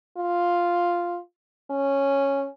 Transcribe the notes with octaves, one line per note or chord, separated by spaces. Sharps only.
F4
C#4